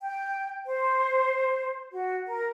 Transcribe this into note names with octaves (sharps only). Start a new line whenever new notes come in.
G5
C5
F#4
A#4